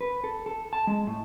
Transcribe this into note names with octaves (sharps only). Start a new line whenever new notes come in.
B4
A4
A4
A5
G#3
A2